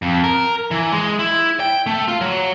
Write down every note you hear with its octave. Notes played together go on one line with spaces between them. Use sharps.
F2
A#4
E3
G#3
E4
G5
A3
F4
F#3